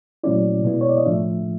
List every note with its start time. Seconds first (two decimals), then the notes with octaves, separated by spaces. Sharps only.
0.24 A#2 F#3 A3 C#4 E4 D5
0.64 B2 G#3 B3 E4
0.81 C#5
0.89 D5
0.98 D#5
1.06 A2 F3 A3 D4 E5